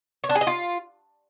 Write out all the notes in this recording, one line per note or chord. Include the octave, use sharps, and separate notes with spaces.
C#5
D4
G#4
D#5
F4